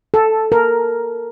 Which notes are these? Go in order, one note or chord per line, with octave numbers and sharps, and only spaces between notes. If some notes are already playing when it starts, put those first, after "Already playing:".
A4
A#4